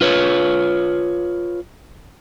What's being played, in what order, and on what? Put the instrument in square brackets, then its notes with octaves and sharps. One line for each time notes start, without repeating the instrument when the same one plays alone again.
[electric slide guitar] F4 B4 C#5